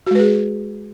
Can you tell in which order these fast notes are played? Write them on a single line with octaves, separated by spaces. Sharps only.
F#4 G#3 B4 G#4